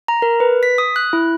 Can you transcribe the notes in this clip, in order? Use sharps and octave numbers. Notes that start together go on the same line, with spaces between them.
A#5
A#4
B4
B6
D#6
F#6
E4